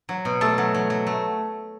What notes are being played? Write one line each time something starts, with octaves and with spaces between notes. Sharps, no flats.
F#3
B2
A3 A4
F#3
F#3
F#3
A3